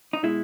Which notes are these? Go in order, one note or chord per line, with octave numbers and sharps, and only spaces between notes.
D#4
B2 G#3 E4